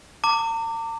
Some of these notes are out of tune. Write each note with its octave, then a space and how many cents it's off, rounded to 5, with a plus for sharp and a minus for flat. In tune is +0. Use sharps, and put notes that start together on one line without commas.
A#5 -45 D6 +0